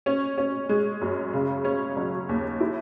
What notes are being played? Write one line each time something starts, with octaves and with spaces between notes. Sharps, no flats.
C#4
C#4
G#3
F#2
C#3
C#4
F#3
D#2
E4